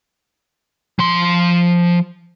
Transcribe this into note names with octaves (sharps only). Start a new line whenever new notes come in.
F3 C6